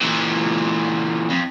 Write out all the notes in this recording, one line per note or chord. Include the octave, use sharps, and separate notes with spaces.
A#2 E3
F2